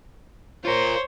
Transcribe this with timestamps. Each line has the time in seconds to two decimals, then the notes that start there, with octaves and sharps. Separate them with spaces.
0.65 F4 A#4 C5 C#5